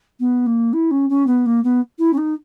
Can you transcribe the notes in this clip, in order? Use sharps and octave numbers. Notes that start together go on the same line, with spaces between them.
B3
A#3
E4
C#4
C#4
B3
A#3
B3
E4
C#4
D#4